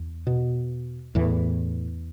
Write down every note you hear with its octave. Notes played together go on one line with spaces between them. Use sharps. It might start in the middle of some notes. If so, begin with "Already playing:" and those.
Already playing: E2
B2
E2 A2 E3